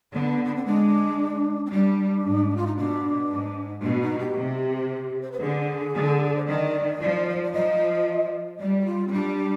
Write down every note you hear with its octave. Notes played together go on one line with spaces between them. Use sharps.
D3 B3
B3
C4
G#3 D4
C4
G3 D4
G#2
F4
D#4
B2 D4
G#2
B2 D4
D#4
G4
C3
C5
B4
D3 G#4
D3
C5
D#3 D5
F3
C5
D5
F3 D#5
G3 D5
G4
F4
C4
G3 D4